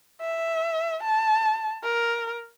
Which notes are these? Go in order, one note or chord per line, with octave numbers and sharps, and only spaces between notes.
E5
A5
A#4